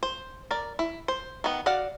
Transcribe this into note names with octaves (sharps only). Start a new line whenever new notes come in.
C5
A#4 D5
E4
C5
D#3 B3
F#4 D5 F5 F#5